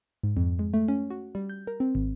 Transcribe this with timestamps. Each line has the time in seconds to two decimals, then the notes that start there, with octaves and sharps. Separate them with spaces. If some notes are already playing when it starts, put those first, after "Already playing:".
0.23 G#2
0.37 F2
0.59 G#3
0.74 A3
0.88 C#4
1.10 F#4
1.35 G3
1.50 G6
1.67 A#4
1.80 C4
1.95 G#1